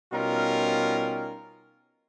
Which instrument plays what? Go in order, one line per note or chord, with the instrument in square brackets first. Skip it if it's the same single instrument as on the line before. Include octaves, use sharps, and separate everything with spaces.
[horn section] B2 G3 C#4 D#4 F4 A#4